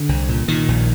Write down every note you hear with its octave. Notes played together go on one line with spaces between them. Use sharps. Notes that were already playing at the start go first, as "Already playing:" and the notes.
Already playing: D3
C2
A#2
A#2 D#3
A#1